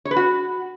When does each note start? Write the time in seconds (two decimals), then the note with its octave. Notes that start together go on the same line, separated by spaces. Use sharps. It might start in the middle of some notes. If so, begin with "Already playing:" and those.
0.05 C#5
0.11 B4
0.16 F#4